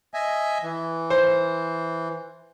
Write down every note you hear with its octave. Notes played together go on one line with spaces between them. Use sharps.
D#5 E5 G#5
E3
C5